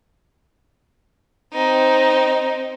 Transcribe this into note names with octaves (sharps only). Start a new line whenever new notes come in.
C4 D#4